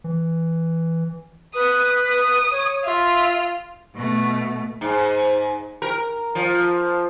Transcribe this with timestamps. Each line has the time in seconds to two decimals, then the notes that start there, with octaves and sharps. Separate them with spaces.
0.04 E3
1.55 B4 D#6
2.08 D#6
2.51 C#5
2.85 F4 E5
3.95 B2 A3
4.81 G#2
5.82 A#4
6.35 F3